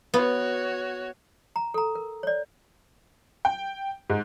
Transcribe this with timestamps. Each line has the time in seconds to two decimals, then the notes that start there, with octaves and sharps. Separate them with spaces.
0.14 B3 F#4 C#5
1.56 A#5
1.74 A4 A#5
1.95 A#4
2.23 C#5 D5
3.45 G5
4.10 G#2